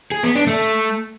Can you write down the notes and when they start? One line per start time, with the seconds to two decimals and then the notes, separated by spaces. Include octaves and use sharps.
0.12 G#4
0.23 B3
0.35 D4
0.47 A3